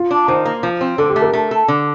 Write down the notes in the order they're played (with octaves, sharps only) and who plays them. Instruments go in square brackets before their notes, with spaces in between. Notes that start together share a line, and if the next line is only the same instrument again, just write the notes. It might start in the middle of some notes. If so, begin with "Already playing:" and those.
Already playing: [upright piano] F4
[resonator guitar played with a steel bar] D4
[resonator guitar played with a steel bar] D#3 [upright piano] C5
[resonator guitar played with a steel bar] A#3
F3
C4
[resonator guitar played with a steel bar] D3 [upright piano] A4
[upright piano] G4
[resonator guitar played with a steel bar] A3
[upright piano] A#4
[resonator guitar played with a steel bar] A3
A4
D3